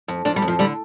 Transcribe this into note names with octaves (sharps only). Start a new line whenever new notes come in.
F2
F2 D4
G3
F2
F3
D3 G3